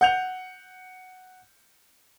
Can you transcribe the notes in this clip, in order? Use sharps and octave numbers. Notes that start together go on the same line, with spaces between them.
F#5 G6 F7